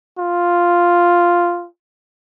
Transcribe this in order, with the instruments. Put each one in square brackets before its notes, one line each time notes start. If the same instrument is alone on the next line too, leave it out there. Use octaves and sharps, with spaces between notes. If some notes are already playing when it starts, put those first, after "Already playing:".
[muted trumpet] F4